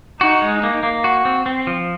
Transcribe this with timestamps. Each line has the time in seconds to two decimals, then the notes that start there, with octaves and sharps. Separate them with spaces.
0.21 D#4 F#4
0.42 G#3
0.63 A#3
0.83 A#3
1.04 F#4
1.25 C4
1.46 C4
1.67 F3